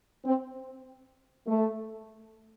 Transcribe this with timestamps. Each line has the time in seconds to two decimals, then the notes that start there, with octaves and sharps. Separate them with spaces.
0.25 C4
1.48 A3